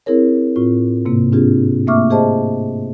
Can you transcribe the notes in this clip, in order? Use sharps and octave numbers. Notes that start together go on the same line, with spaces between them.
C4 E4 G#4 A#4 C#5
A2 C4 F4
G#2 C3 A#3
C4 D4 F4 G4 G#4
A3 A#3 E5 C#6 D6 F6
G4 G#4 C5 D#5 A5